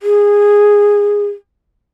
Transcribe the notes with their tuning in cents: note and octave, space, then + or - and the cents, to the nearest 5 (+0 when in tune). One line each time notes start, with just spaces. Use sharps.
G#4 -15